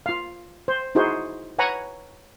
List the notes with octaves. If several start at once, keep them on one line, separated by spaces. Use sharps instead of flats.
F4 F5
C5
D#4 E4 F#4 G#4 C5
B4 C#5 F#5 G#5 A#5 B5